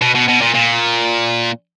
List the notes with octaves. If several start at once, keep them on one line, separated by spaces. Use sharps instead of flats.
B2
B2
B2
A#2
A#2